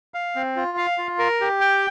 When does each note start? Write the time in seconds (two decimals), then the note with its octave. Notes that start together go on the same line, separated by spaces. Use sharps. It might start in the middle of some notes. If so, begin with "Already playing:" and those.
0.14 F5
0.36 C4
0.56 F4
0.77 F5
0.98 F4
1.19 A#4
1.41 G4
1.61 G5